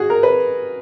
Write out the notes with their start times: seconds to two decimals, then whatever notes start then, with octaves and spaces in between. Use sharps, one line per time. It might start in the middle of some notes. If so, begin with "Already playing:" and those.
Already playing: F#4 G#4
0.10 A#4
0.23 B4